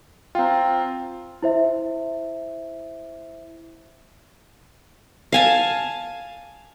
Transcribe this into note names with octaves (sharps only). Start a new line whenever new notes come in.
C4 F4 G5 A#5
E4 C5 E5
F5 G#5 A5